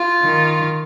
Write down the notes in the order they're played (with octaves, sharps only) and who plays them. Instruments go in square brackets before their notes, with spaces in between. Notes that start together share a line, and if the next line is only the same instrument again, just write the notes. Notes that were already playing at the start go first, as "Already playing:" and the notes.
Already playing: [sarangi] F4
[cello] D#3